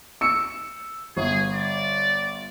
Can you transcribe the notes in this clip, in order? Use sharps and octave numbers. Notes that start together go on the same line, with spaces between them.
E6 C#7
G1 G#4
D5